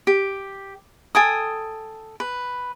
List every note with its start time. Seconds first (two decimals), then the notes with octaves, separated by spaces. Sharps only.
0.07 G4
1.15 A4 G5 G#5 D#6
2.20 B4